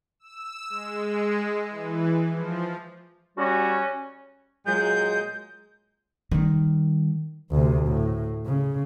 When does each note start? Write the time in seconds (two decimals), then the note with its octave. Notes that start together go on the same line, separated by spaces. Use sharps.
0.19 E6
0.70 G#3
1.70 E3
2.31 F3
3.38 G3 C#4 F#4
4.66 A#2 F#3 G#3 G6
6.31 D#3 G3
7.52 D2 C3
7.88 A2
8.46 C#3